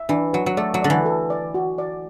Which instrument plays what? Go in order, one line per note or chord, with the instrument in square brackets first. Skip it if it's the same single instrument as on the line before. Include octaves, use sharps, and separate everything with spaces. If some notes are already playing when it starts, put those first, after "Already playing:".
Already playing: [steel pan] E5
[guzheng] E3 [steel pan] D4
[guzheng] F#3 [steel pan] B4
[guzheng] F#3
[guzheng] A3 [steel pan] D5
[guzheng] F#3
[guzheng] D3 [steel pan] D5
[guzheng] E3
[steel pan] A4
D5
F#4
D5